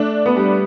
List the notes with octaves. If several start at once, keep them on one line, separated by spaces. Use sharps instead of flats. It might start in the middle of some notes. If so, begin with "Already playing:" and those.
Already playing: A3 D4
B3
G3